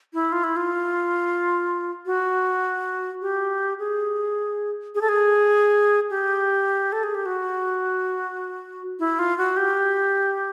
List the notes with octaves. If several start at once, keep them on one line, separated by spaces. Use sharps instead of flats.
E4
F4
E4
F4
F#4
G4
G#4
G#4
A4
G#4
G4
A4
G#4
G4
F#4
E4
F4
F#4
G4